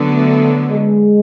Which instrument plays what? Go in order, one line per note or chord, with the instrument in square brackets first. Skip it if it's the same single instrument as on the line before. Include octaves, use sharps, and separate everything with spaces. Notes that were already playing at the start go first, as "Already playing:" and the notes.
Already playing: [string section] D3 F#3 B3
[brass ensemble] A3
G#3